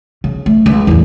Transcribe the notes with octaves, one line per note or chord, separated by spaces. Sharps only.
C#3
A3
C#2
E2 A2